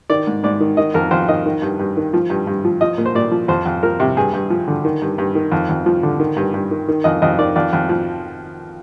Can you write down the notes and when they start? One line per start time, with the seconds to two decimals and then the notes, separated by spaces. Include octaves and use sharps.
0.10 D#3 D5
0.27 G#2
0.44 G#2 D5
0.60 D#3
0.77 D#3 D#5
0.94 F2 A#4
1.11 F2 C5
1.28 D#3 D#5
1.46 D#3
1.62 G2
1.79 G2
1.97 D#3
2.13 F3
2.30 G2
2.47 G2
2.65 F3
2.81 F3 D#5
2.98 A#2
3.06 C5
3.15 A#2 D5
3.31 F3
3.48 F2 C5
3.66 F2
3.83 F3 A#4
4.00 C3
4.17 G2 G#4
4.33 G2
4.50 F3
4.68 D3
4.85 D#3
5.02 G2
5.18 G2
5.35 D#3
5.52 F2
5.69 F2
5.86 F3
6.03 D3
6.20 D#3
6.37 G2
6.54 G2
6.71 D#3
6.88 D#3
7.04 F2 D#5
7.22 F2 D#5
7.39 D#3 D5
7.56 F2 D5
7.73 F2
7.89 F3